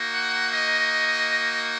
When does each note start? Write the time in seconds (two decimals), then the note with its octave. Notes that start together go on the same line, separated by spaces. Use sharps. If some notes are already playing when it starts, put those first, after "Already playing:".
Already playing: A#3 D#4 F#4
0.14 F#5
0.53 D#5